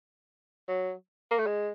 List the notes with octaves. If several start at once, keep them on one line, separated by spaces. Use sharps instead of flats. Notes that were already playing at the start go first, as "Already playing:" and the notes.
F#3
A#3
A3
G#3